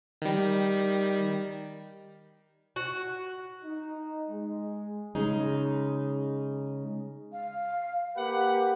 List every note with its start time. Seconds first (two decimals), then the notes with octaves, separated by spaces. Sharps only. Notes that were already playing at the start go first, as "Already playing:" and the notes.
0.22 D#3 G3
2.76 F#4
3.65 D#4
4.29 G#3
5.15 C#3 G#3 D#4
7.32 F5
8.16 A#3 G4 B4 F#5